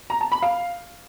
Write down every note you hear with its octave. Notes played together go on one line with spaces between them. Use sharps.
A#5
A5
B5
F5